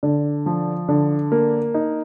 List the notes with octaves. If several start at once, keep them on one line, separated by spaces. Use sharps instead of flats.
D3
F3
D3
A#3
D#4